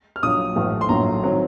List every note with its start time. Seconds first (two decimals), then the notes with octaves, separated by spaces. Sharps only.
0.16 F6
0.23 A#1 A#2 F#3 D#6
0.56 A1 A2 F3 A3
0.81 C6
0.89 A#1 A2 F#3 A#3 A#5
1.23 D#3 F#3 C4